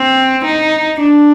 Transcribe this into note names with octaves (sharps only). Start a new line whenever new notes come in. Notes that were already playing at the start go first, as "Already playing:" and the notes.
Already playing: C4
D#4
D4